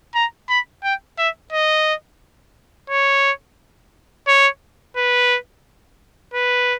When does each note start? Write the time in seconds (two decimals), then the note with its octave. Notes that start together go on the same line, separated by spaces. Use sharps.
0.15 A#5
0.49 B5
0.84 G5
1.18 E5
1.53 D#5
2.90 C#5
4.27 C#5
4.96 B4
6.34 B4